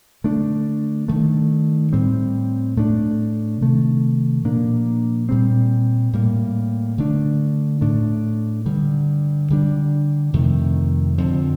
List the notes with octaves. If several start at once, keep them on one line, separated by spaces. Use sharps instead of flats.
D3 A3 D4
G2 D#3 A3
A2 G3 C4
A2 A3 D4
C3 D#3 A3
A#2 F3 A#3 D4
A#2 G3 C4
A2 G3 A#3
D3 A3 D4
A2 A3 D4
G2 D3 G3
D3 G3 D4
F2 C3 D#3 A3
F2 D3 F3 C4